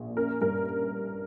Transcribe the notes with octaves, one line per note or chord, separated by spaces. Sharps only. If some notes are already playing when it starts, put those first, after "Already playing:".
Already playing: A#1 A#2
C#4 A#4
G2 A#4